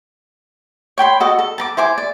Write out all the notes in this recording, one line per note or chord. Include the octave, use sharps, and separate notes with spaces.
C#5 G5 B5 C6
F#4 A4 D#5
A4
A5 A#5 D6
E4 C5 G#5 D6
D5